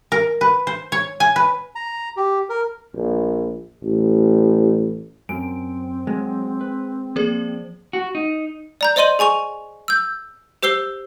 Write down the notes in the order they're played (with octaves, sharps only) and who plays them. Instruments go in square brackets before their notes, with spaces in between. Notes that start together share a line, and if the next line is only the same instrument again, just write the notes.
[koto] A#4
B4
C5
C#5
G#5
B4
[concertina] A#5
G4
A#4
[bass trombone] A#1
A1
[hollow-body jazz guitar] F#2 [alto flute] C4 [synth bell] D7
[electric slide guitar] F#3 [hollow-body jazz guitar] G#3
[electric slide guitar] B4
[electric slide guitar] F3 D5 [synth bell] A#3 G#4
[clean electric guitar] F#4
D#4
[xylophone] D5 A#5 G6
C5 D5 D#5 C6 D#7 F#7
G#4 G#5 C#6 F7
E6 G6
G4 C5 E6 C7 G7